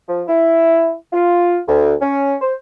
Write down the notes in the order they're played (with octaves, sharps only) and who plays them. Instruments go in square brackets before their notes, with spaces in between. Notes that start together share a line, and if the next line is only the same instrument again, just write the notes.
[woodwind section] F3
E4
F4
D2
C#4
C5